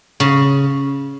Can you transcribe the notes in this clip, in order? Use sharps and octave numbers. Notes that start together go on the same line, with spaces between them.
C#3